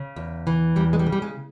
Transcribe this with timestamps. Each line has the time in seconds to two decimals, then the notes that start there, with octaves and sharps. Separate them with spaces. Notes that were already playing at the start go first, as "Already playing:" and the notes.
Already playing: C#3
0.16 E2
0.47 E3
0.76 E2 G3
0.93 G#3
0.99 G3
1.07 C#3
1.12 G3
1.22 G#3